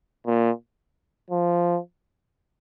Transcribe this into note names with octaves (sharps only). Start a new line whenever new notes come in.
A#2
F3